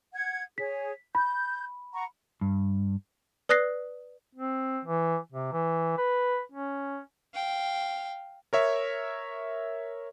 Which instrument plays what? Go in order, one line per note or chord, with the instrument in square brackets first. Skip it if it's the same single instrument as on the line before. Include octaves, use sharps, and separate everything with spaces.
[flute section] F#5 G#6
[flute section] G#4 C#5 [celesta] B6
[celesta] B5 [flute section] G6
[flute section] F#5 A#5 C#6
[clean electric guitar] G2
[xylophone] B4 D5 D#6 F#6 A#6 C7
[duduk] C4
E3
C3
E3
B4
C#4
[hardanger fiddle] F5 G5
[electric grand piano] A#4 C#5 E5